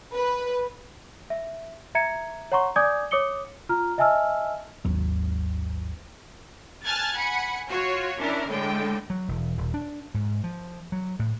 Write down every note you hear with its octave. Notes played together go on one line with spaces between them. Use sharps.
B4
E5
E5 A#5 G#6 C#7
C#5 F#5 A#5 C6 C#6
D5 G#5 D6 D#6 G6 G#6
C#5 D6 D#6 C#7 G7
F4 A#5 F6
D#5 E5 G#5 A5 E6 F6
G#1 D#2 F#3
G#5 A5 F6 F#6 G#6 A6
F#5 G#5 B5 C#7
F4 F#4 C#5
C#4 D4 E4 A#4
A2 D3 G#3 G5
F#3
E1
D#1
D4
G#2
F3
F#3
A2